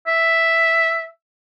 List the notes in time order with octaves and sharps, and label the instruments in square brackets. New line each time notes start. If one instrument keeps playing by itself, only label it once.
[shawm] E5